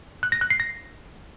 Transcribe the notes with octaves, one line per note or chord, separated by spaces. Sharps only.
F#6
A#6
F#6
C7
A#6